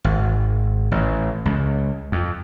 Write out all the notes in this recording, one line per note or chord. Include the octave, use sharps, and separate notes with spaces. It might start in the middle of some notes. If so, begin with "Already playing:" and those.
G#1
A1
C#2
F2